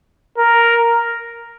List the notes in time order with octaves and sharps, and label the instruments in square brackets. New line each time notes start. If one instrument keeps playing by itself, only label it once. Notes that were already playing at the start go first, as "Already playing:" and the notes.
[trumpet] A#4